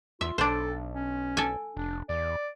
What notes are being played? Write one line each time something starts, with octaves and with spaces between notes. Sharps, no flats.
E2 F4 E5
B1 D4 A4 C5
C#4
A4 G#5
F1 D4
E2 D5